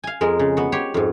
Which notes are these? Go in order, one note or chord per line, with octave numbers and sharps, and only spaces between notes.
F5 G#5
F2 G#3 A#4
C#3
B3 F#4
G4 C#5 C6
F2 G#2